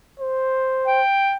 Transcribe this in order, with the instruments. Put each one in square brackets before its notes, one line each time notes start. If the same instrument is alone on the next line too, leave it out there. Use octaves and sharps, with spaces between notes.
[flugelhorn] C5
[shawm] G5